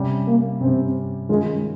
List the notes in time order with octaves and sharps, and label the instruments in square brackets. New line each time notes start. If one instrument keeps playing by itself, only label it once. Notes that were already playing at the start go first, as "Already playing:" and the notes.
Already playing: [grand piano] C3 G3 C#4 G4
[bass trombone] A#3
[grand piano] C3 G3 C#4 G4 [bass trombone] C4
[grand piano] D#3 G3 C#4 F4 A#4 [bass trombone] G#3